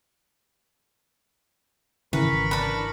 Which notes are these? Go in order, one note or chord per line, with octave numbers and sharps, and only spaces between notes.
G#1 C#3 E3 A#4 B4 B5 C#6
D4 B4